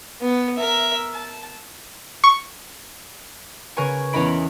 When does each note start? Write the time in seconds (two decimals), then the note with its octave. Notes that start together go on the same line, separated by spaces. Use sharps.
0.21 B3
0.58 A#4 E5
1.14 A5
2.24 C#6
3.77 C#3 A#4 B4 G#5 C#6
4.13 E2 C#4 A#4 D#5 B5 D7